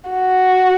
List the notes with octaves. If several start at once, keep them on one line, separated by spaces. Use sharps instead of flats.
F#4